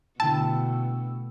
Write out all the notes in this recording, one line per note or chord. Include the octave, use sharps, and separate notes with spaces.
B2 D3 A3 E4 G5 A5 E6